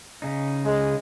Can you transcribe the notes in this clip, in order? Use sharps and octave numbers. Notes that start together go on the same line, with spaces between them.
C#3 D#4
G#3